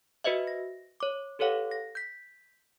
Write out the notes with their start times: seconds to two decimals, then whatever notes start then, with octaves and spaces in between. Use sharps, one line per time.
0.24 F#4 B4 C5 D#5 E5
0.47 A#6
1.00 C#5 D6
1.39 G4 A4 B4 C#5 F5 F#5
1.71 A#6
1.95 G6 B6